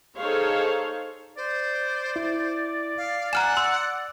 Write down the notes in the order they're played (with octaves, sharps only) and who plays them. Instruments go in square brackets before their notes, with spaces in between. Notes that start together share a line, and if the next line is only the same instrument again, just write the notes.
[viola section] D#4 G#4 A4 C5 C#5 F5
[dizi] C5 [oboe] D5
[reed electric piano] E4
[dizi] F5
[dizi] F#5 [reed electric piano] G#5 [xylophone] A#5 F6 E7
[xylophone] C6 [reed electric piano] E6